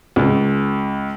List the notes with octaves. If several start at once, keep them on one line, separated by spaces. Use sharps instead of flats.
C#2